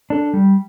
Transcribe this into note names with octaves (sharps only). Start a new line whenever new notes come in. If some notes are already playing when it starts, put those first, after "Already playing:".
D4 A4
G3